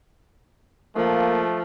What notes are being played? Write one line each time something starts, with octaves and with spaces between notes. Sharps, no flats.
F3 A3 A#3